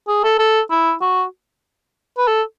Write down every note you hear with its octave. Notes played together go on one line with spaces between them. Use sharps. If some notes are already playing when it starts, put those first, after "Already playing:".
G#4
A4
A4
E4
F#4
B4
A4